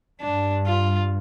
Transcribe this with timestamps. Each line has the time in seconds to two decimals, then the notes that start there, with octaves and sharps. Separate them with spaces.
0.21 G2 D4
0.66 F4